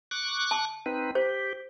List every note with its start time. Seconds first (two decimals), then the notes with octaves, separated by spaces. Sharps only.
0.11 C#6 D6 F#6
0.51 A5
0.86 C4 D#4 B4
1.15 G4 C5